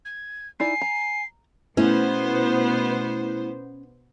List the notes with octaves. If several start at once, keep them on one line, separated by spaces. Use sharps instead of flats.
G#6
D#4 E4 D5 G#5 C7
A#5
B2 A3 B3 C#4 E4 C5